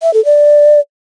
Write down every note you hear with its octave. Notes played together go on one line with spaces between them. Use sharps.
E5
A4
D5